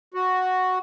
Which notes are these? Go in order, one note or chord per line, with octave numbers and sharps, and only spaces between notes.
F#4